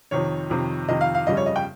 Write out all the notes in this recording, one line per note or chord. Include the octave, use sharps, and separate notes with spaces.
F2 C3 D#3 C#5
F2 C3 D#3
F2 C3 D#3 D#5
F5
F5
G1 F2 C#3 G3 D#5
C#5
D#5
G5